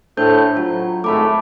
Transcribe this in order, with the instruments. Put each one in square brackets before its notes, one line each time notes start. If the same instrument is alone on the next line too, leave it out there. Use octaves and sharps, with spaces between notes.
[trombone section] A2 A3 [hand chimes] D4 C5 G6
[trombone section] F#3 [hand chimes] F4
[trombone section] G#1 A2 A3 [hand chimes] A5 B5 D6